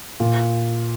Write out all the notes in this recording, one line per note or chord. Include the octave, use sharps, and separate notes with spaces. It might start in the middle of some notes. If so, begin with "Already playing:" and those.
A#2